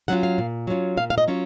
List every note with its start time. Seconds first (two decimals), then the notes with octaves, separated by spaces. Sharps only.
0.08 F#3 C#4 F4 F#5
0.23 F5
0.38 A#2
0.67 F#3 C#4 F4
0.97 A#2 F5
1.10 F5
1.18 D#5
1.28 F#3 C#4 F4